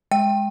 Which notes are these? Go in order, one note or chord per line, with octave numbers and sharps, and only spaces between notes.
G#3 G5